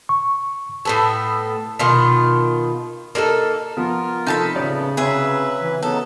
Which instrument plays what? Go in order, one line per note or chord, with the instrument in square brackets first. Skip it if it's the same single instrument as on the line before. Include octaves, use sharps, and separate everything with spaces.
[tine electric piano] C#6
[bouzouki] A2 B3 A4
B2 D#3 F4
A#3 D#4 F#4 A4
[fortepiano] F3 B3 [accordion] F4 A#4
[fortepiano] C3 F3 [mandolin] D#4 A5 B5 [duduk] A4
[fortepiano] A1 C#5 D5 [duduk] C#3 [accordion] B3
[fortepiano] C3 C#4 [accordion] F#3 B4 [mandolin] G#4 E5
[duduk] E3
[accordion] C#3 F#3 D#4 [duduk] B3 [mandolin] A4